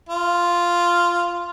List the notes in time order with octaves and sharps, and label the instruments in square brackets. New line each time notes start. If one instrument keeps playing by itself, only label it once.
[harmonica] F4